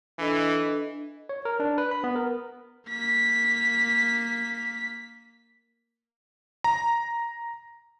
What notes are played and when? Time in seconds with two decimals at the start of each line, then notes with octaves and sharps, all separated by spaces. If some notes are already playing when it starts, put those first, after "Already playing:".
0.19 E3 D4 A4 D#5
1.29 C#5
1.45 A#4
1.60 D4
1.78 B4
1.91 B5
2.04 B3
2.15 A#4
2.88 A#3 B6
6.64 A#5